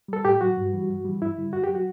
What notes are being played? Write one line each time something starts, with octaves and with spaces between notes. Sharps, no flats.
G3 A4
A2 G4
F#3 F#4
G2
E3 G3
G2
E3 G3
G2 E4
D3 G3
F#2 F#4
G4
F#3
F#4